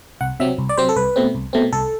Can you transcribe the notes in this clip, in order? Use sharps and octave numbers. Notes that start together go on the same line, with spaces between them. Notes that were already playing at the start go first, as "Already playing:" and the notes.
C2 F#5
C3 F#3 C4 E5
C2
D5
C3 F#3 C4 C5
A4
C2 B4
B2 A3 C4
C2
B2 A3 C4
C2 A4